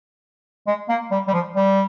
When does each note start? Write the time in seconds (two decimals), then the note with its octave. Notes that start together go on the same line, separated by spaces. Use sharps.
0.67 G#3
0.89 A#3
1.11 G3
1.28 G3
1.33 F3
1.55 G3